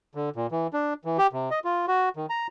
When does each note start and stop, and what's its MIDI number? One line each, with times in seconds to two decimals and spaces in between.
0.15 0.29 50
0.36 0.47 46
0.52 0.67 52
0.73 0.94 62
1.05 1.17 52
1.18 1.27 67
1.33 1.49 48
1.51 1.59 75
1.64 1.86 65
1.88 2.09 66
2.16 2.26 51
2.30 2.47 82